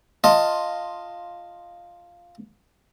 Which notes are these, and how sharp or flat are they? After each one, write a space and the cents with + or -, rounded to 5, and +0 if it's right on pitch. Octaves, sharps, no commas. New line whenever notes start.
F4 +0 D#5 +0 A5 +20